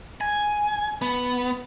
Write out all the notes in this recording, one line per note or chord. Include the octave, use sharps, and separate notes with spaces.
G#5
B3